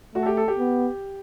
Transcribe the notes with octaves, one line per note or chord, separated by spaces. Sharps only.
A3 F#4
A4
G4
A4
G4
B3